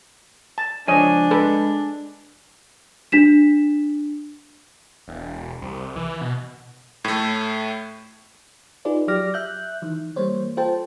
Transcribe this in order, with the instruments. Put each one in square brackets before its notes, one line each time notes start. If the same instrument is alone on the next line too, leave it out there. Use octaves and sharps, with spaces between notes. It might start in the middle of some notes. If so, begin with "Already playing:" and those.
[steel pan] A5
[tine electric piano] C#2 F3 [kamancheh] D4 [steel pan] C#5 D#5 [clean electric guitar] G#5
[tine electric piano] G#3 [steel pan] A4 B4
[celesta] D4 B6 E7
[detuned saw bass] E1
C2
E3
B2
[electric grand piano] A2 A3
[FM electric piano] D#4 F4 G#4 B4 D5
F#3 G4 D5 D6 F6 A#6
E5 F#6 G6
D#3 E3
E3 G3 A#3 C5 C#5
F4 A4 C5 G5 A5